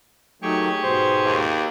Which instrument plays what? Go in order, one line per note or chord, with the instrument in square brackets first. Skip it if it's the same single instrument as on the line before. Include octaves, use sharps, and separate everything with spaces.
[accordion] D#3 F#3 A3 [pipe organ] G4 G#4 C#6
[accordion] G#2 B2 [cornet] C5
[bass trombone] D#2